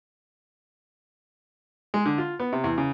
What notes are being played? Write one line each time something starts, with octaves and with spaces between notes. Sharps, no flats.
G#3
D3
F4
B3
C3
E2
C#3